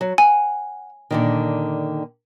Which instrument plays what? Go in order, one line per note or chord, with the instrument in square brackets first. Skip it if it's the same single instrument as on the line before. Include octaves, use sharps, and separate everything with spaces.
[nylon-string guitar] F#3
[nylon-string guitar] F#5 [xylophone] G#5
[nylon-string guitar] A#2 D3 D#3